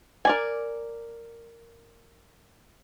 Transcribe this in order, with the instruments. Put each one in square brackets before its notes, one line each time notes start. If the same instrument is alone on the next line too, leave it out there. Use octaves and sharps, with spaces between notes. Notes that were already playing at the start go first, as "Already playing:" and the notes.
[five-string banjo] A#4 D5 G#5